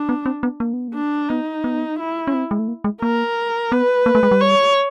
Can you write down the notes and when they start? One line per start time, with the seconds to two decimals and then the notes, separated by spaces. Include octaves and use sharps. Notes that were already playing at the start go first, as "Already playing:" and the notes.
Already playing: D4
0.09 B3
0.26 C4
0.43 B3
0.60 A#3
0.73 B3
0.88 A#3
0.94 D4
1.29 B3 D#4
1.64 B3
1.99 E4
2.27 C#4
2.34 C4
2.51 G#3
2.59 A3
2.68 A#3
2.84 G#3
3.02 A#3 A#4
3.72 B3 B4
4.06 A#3
4.15 A3
4.23 G#3
4.31 G3
4.41 C#5